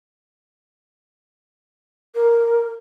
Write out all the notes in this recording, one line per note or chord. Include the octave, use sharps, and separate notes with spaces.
A#4